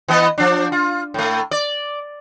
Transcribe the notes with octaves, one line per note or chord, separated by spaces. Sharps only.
E3 B3 D#5
F3 D4
F4
A2 A3
D5